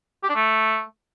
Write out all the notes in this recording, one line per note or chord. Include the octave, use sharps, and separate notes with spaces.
G4
D4
A3